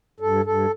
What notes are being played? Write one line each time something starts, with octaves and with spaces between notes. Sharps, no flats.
G2 A4
G2 A4